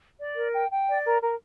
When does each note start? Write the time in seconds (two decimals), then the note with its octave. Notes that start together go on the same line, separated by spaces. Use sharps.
0.19 D5
0.36 A#4
0.53 G5
0.71 G5
0.88 D5
1.04 A#4
1.22 A#4